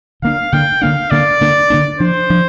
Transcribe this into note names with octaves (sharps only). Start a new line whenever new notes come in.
D3 A#3 D4 F5
D3 A#3 D4 G5
D3 A#3 D4 F5
D3 A#3 D4 D5
D3 A#3 D4
D3 A#3 D4
F3 D4 C5
F3 D4